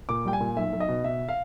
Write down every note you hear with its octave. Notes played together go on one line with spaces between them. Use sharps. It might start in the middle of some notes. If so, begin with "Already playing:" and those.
A#2 D6
G3 G5
G#5
A#2
B1 E5
B1
D#5
B2
B2 E5
F5